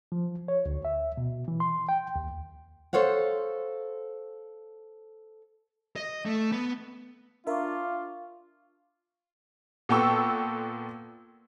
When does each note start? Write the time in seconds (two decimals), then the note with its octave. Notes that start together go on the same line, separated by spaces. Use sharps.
0.12 F3
0.48 C#5
0.66 D2
0.85 E5
1.17 B2
1.48 E3
1.60 C6
1.89 G5
2.16 D#2
2.93 A4 C5 C#5 F5 F#5
5.96 D#5
6.26 A3
6.52 B3
7.47 D4 F4 A#4 E5 F5 C#6 D6
9.89 A#2 B3 A4 G5 C#6 E6